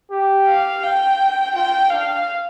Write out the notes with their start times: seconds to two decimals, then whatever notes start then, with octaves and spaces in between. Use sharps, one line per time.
0.11 G4
0.47 F5
0.83 G5
1.55 F4 G5
1.91 D4 F5